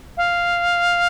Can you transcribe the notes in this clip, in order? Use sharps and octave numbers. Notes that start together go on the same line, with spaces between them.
F5